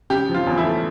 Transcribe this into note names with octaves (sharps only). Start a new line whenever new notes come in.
C#3 G4
F3
F4
E2
E4
A3